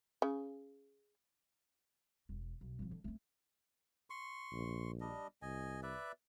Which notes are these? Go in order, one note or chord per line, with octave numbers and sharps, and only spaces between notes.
C#3
E1
B1
G#1 F3
D3
A3 C#4
C6 C#6
A#1
G3 D4 D#5
C2 D#5 G#5
B4 D5 E5